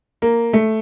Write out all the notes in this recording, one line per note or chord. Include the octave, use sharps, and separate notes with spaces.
A#3
A3